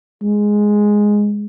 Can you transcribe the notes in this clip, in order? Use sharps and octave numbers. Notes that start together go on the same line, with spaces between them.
G#3